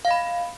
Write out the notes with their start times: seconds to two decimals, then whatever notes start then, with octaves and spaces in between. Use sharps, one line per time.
0.05 F5
0.08 D#5
0.11 B5